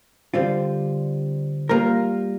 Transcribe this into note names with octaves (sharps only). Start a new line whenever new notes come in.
D3 G3 C4 F4
G3 A#3 F4 A#4